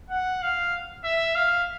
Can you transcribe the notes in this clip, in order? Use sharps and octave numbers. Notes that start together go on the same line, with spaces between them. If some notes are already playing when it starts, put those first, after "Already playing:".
F#5
F5
E5
F5